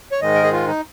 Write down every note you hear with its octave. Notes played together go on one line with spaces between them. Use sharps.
C#5
G#2 D#3 G#3 D#5
A#4
G#4
F4
D#4